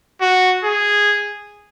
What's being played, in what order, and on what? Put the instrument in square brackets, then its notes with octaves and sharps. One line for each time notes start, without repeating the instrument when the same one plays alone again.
[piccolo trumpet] F#4
G#4